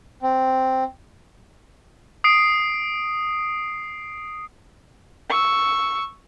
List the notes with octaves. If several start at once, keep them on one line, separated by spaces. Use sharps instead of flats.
C4
D#6 C7 D7
C#6 E6